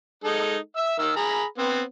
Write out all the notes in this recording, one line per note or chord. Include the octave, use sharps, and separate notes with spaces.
G#3 D#4 A4
E5 E6
D#3 E6
G#4 A#5 B5
B3 C4